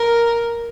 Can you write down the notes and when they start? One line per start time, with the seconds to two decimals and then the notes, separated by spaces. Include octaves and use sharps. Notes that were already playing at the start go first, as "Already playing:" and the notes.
Already playing: A#4